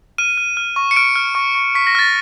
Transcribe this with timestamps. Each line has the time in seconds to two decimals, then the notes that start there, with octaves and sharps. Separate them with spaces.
0.18 F6 D#7
0.37 F6
0.57 F6
0.76 C#6
0.91 C#7
0.96 F6 D7
1.16 F6
1.35 C#6
1.55 C#6
1.75 C#6 B6
1.87 A#6
1.95 F6 A6